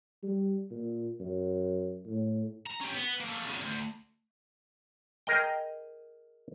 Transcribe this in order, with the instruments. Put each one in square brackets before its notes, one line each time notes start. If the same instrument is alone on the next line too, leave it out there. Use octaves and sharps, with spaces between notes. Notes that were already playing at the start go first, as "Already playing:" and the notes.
[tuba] G3
A#2
F#2
A2
[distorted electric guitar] A#5
C#4 G4
B3
A3 A#3
E2 C#3
D2
[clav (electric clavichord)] G#4 A#4 D#5 G5